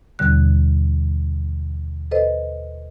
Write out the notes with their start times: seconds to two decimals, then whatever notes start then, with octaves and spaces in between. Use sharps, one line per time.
0.19 D#2 B2 D3 G3 F#6
2.11 A4 B4 C5 D#5